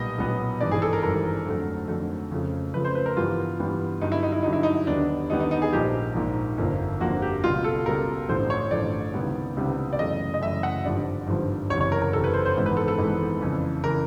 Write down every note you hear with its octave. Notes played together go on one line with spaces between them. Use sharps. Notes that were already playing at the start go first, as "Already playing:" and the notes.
Already playing: B1 A#2 G3 B3 D#5
B1 A#2 G3 B3
G#1 G2 E3 D5
G#4
A4
A#4
G#1 G2 E3 A#4
F2 D3 F#3 A3
F2 D3 F#3 A3
F2 C#3 F3 A3
F2 C#3 F3 A3 B4
C5
B4
A#4
G2 E3 G3 B3 F4
G2 E3 G3 B3
G2 D3 F#3 D#4
E4
D#4
E4
G2 D3 F#3 D#4
E4
D#4
D#2 D3 G3 B3 D4
D#2 D3 G3 B3 D#4
D#4
D#4
G#4
A#1 G#2 F3 A#3 G4
A#1 G#2 F3 A#3
G1 F2 D3 F3 A#3
G1 F2 D3 F3 A#3 F#4
G4
C#2 B2 G3 F4
A4
C#2 B2 G3 A#4
A1 G2 D3 F3 A3 C5
C#5
A1 G2 D3 F3 A3 D5
C#2 C3 D#3 G3 B3
C#2 C3 D#3 G3 B3
D5
F#2 C#3 E3 A3 D#5
D#5
F#2 C#3 E3 A3 E5
F#5
G#1 G2 D3 F3 D5
G#1 G2 D3 F3
F#1 E2 C3 C#5
C#5
A#4
A#4
F#1 E2 C3 A4
B4
C5
C5
G#1 G#2 E3 G#3 B3
B4
A4
A4
G#1 G#2 E3 G#3 B3
F2 C#3 E3
C#3 E3 A#4